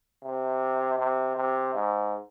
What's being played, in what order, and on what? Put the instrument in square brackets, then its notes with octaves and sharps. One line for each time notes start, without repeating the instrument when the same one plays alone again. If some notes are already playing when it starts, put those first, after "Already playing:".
[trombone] C3
C3
C3
G#2